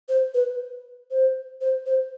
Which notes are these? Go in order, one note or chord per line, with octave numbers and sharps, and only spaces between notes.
C5
B4
C5
C5
C5